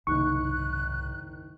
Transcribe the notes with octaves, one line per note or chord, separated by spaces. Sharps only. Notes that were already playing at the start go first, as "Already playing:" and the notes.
F#1 C2 G#2 D#3 C#6 F#6